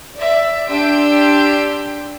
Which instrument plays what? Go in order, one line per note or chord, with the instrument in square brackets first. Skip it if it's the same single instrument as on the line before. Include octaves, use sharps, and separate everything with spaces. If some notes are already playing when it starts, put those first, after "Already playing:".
[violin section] D5 E5
D4 G4 C6 E6 G6 D7